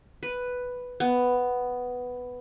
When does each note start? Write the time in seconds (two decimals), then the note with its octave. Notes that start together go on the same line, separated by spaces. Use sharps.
0.23 B4
1.00 B3